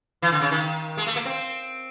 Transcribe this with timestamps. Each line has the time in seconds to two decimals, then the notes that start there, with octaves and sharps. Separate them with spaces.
0.22 E3
0.32 D3
0.41 C#3
0.51 D#3
0.97 G#3
1.07 A3
1.16 A#3
1.25 C4